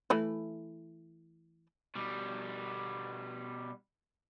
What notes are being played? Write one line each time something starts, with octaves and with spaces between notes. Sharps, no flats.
E3 A3 E4
B2 G3